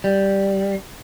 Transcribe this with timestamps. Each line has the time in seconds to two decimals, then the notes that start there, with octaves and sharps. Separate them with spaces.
0.04 G3